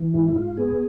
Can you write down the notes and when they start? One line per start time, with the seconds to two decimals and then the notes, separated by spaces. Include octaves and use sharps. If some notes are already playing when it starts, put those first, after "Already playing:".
Already playing: E3
0.14 G#2 E4
0.28 E4
0.35 G#2 F4
0.57 B3 G#4